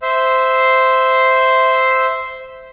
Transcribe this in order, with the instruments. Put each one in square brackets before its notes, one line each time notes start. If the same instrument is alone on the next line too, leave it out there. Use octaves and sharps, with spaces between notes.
[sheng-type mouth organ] C5 E5